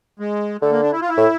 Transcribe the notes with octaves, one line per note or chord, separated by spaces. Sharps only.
G#3
D3 A3
A#3
D4
E4
F4
E4
A2